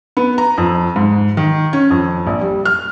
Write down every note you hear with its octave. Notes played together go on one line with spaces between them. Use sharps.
B3
A#5
F2
G#2
D#3
C#4
F2
A#1
G3
F6